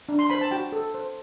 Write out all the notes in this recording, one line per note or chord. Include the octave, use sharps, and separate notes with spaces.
D4
C6
C5 B5
A5
F#4 G5
A4
C5